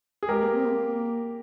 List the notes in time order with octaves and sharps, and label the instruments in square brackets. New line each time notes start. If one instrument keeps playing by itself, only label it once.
[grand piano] G#4
[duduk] G#3 [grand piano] G4 A#4
[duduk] A#3
C4
A#3